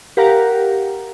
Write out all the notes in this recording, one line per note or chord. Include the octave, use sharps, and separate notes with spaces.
G4 A#4 F5 F#5 A#5